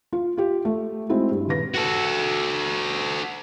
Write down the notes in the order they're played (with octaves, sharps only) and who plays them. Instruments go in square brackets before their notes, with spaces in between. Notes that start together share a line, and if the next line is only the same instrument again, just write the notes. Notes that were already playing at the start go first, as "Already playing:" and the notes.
[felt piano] F4
F4 G4
A3
G#3 C4 D#4 E4 F#4
G2
D#1 B4 A#6
[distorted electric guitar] F#4 A4